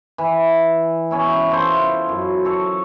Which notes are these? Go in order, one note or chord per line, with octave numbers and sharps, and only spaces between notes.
E3
B3 C#4 E4
E4 F4 A4 C5
F#2
A4 C#5